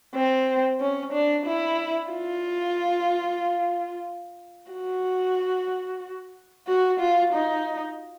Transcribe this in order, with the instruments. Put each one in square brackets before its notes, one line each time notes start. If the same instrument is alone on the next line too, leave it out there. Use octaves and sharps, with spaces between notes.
[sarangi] C4
C#4
D4
E4
F4
F#4
F#4
F4
D#4